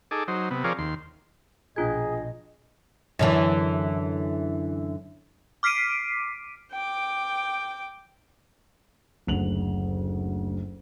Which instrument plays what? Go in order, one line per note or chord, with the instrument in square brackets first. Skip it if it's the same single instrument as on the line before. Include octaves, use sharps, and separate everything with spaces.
[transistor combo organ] D#4 G#4 A4 D6
F#3 D#4 C5
C3 B3
F3 C4 G#4 A#4 C#5 D5
D#2 C6
[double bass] A#1 B2 [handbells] D4 F4 G#6 [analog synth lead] G#4 [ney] D#5
[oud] F#2 D3 E3
[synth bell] D6 F6 B6 C7 D7 D#7
[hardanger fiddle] G5 D6
[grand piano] F#1 D2 F7 F#7